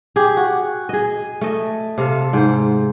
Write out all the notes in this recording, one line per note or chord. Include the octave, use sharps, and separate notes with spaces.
G4 G#4
F#4
G#4 D#5
A3 D#5
C3 A4 F5
G#2 C5